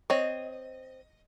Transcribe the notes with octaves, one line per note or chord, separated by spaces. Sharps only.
C4 C#5 D#5